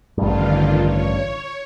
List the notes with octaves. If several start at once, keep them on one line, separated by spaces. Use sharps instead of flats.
A1 G2 D3 D#3 F4
C#5